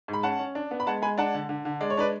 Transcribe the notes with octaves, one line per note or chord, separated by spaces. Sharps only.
G#2
B5
C#4 F#5 A5
C#4
D4
B3
B5
G#3 F#5 A5
G#3 G#5 B5
D4 F#5 A5
D3
D3
D3
G#3 D5
C#5
D4 B4 D5